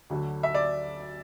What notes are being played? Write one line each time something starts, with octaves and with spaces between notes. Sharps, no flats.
D2 D3 F#3
E5
D5